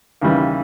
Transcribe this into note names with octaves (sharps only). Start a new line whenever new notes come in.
D#2 C#3 E3 G3